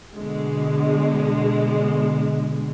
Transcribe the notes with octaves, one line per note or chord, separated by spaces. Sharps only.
B2 D3 G#3